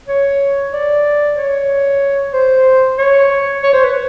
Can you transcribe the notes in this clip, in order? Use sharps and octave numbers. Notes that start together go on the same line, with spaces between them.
C#5
D5
C#5
C5
C#5
C#5
C5
B4